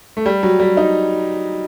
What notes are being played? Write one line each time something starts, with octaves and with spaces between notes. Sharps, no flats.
A3
G3
F#3
G3
D#4